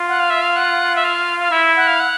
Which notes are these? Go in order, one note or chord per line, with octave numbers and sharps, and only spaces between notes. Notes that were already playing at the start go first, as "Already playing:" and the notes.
Already playing: F4
F#5
F5
E5
F5
F#5
E5
F5
F5
E4 E5
F#5
F5
F#5